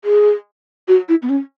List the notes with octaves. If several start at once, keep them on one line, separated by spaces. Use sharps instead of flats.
G#4
F#4
E4
B3
C#4